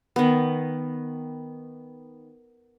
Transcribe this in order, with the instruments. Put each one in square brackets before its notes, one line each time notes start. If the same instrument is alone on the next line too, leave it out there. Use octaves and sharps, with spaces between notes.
[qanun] D#3 B3